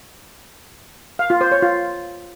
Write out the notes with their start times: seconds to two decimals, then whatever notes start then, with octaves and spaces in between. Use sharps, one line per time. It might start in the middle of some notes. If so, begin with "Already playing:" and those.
1.19 F5
1.30 F4
1.41 C5
1.52 C#5
1.62 F4